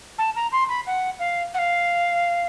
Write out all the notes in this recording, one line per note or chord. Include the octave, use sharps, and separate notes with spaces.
A5
A#5
C6
B5
F#5
F5
F#5
F5